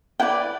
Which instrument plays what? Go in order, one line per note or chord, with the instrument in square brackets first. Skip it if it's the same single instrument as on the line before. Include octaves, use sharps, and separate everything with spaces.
[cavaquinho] E4 B4 D5 G5